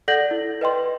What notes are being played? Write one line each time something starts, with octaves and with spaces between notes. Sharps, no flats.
A4 D5 F#5 G6 A#6 F#7
E4
B4 D#5 G5 C6